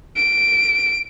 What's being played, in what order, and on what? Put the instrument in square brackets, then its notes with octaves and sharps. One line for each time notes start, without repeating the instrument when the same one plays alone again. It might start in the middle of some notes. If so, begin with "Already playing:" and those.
[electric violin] D7